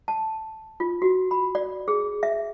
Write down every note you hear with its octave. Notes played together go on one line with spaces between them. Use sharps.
A5
F4
F#4
B5
D5
G#4
E5